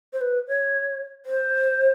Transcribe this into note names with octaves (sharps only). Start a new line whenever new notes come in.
C5
B4
C#5
C5